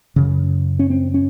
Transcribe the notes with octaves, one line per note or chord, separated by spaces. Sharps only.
F#2 C#3
C#4
C4
C#4